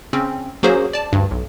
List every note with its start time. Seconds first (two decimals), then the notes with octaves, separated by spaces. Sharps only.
0.13 C#3 C4 C#4
0.63 F#3 A#3 C#4 F#4 G#4 C5
0.93 D5 A5
1.12 D2 G2
1.31 B1